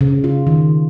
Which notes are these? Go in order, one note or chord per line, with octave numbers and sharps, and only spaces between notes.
C#3
F4
D#3